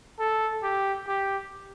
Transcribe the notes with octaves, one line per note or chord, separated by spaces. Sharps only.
A4
G4
G4